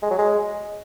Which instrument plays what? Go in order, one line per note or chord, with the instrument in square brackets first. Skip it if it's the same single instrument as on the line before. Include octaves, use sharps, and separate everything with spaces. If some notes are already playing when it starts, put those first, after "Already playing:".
[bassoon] G#3
F#3
G#3